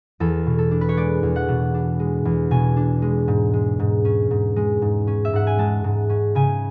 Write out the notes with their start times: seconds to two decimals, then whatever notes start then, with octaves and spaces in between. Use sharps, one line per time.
0.20 E2 A4
0.46 B2
0.58 A4
0.71 D4
0.81 B4
0.89 C#5
0.97 G#3 D5
1.23 E2
1.36 F#5
1.48 B2
1.74 D4
1.99 G#3
2.25 E2
2.51 B2 G#5
2.76 D4
3.02 G#3
3.28 G#2
3.53 G#3
3.80 G#2
4.05 C#4
4.31 G#2
4.56 G#3
4.82 G#2
5.07 C#4
5.25 E5
5.33 G#2 F#5
5.47 G#5
5.58 G#3 A5
5.84 G#2
6.09 C#4
6.35 C#3 G#5